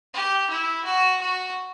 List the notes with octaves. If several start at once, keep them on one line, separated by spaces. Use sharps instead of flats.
G4
E4
F#4
F#4